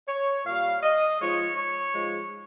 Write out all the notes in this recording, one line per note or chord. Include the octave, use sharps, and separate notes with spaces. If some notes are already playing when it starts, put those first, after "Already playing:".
C#5
A#2 G3 F5
D#5
G#2 F3 G#3 C#5
C#5
G#2 F3 G#3